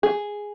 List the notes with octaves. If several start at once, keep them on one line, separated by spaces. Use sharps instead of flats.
G#4